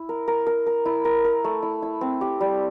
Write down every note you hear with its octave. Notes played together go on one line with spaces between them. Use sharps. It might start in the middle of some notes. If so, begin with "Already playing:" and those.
Already playing: E4
A#4
A#4
A#4
A#4
E4
A#4
A#4
A3
E4
E4
C4
G4
G3